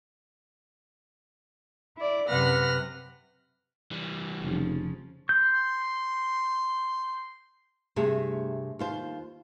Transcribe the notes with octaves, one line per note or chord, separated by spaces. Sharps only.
E4 D5
F#2 C3 B4 F#5 F6 A#6
E3 G3
F1 C#3 F3
C6 G6
G2 C3 A3 G4 G#4 E5
D#2 F4 C5